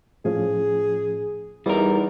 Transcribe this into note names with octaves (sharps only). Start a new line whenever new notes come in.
A2 F3 C#4 G#4
E2 G3 D#4 E4 A#4